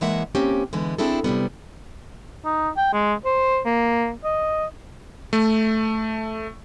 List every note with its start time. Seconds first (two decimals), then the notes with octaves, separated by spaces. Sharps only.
0.01 C#3 E3 G#3 A#3 E5 F#5
0.35 A#3 C4 C#4 G4
0.73 D3 E3 G#3 B3
0.98 C4 D4 E4 G#4 A4
1.24 C3 F#3 G3 B3
2.45 D#4
2.77 G5
2.93 G#3
3.25 C5
3.66 A#3
4.24 D#5
5.33 A3